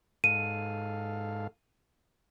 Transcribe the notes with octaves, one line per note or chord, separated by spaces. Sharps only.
G#2 A4 F5 D#7